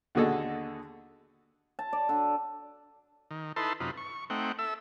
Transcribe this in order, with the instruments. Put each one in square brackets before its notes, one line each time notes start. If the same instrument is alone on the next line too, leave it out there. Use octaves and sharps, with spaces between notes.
[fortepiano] D#2 D3 F#4 G#4 A4 D#5
[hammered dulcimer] A5
D5
D3
[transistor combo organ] D#3
D#4 E4 A4 B4 A5 C6
F#2 C3 D#4 F4 B4
C#6
A3 C4 D#4 F#5 G5
A4 E5 E6